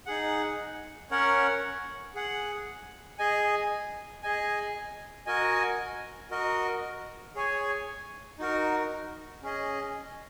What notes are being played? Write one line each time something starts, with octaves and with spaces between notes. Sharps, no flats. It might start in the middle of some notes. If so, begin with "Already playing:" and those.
D#4 G#4 F#5
C#4 A#4 C#5 F#5
G#4 F#5
G#4 D#5 G#5
G#4 D#5 G#5
F#4 A#4 D#5 G#5
F#4 A#4 D#5
G#4 C#5 G#5
D#4 F#4 A#4
C#4 G#4 D#5